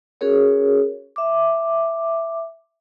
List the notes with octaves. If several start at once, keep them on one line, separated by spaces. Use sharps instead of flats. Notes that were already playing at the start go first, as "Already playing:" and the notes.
C#4 F#4 G#4 A#4 C#5
E5 D6